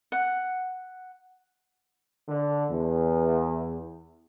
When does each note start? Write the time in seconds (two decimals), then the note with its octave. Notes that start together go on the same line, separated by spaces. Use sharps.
0.12 F#5
2.29 D3
2.70 E2